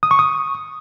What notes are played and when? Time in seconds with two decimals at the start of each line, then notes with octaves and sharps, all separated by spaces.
0.03 D#6
0.11 C#6
0.19 D#6